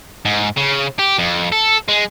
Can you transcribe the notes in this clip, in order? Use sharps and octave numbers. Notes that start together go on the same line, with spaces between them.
G#2
C#3
G4
F2
A4
G#3